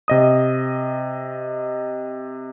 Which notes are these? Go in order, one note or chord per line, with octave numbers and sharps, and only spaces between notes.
C3 D#5 D#6